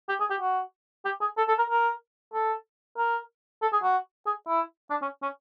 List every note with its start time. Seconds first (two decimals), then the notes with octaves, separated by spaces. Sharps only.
0.09 G4
0.20 G#4
0.30 G4
0.41 F#4
1.05 G4
1.21 G#4
1.38 A4
1.48 A4
1.59 A#4
1.70 A#4
2.34 A4
2.98 A#4
3.62 A4
3.73 G#4
3.84 F#4
4.27 G#4
4.48 E4
4.90 D4
5.02 C#4
5.23 C#4